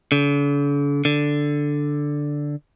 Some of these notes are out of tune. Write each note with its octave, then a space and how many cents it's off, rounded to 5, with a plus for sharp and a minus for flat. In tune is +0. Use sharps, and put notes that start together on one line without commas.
D3 -45
D3 +0